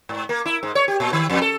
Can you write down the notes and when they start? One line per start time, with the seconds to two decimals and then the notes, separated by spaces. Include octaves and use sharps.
0.09 G#2
0.29 A#3
0.46 E4
0.63 G#2
0.75 C#5
0.88 G4
1.00 A#2
1.13 D#3
1.30 F2
1.42 A4